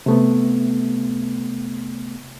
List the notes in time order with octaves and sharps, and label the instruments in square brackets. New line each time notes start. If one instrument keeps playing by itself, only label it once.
[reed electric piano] C3 A3 B3